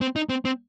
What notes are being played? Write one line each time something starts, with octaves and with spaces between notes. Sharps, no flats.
C4
D#4
C4
C4